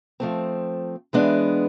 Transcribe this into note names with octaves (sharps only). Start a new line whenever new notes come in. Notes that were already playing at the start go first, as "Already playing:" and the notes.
F3 A3 C4
E3 G#3 B3 D4